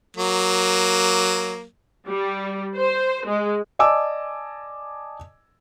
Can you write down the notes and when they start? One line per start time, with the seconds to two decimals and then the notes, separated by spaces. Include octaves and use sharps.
0.17 F#3 A#3
2.08 G3
2.77 C5
3.27 G#3
3.79 D5 D#5 G#5 A5 D6 E6